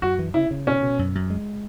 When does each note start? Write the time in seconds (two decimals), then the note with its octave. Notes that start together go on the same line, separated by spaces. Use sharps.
0.02 F#2 F#4
0.19 E3
0.34 C#3 E4
0.51 C#3
0.67 B2 C#4
0.82 B2
0.99 F#2
1.15 F#2
1.30 G#3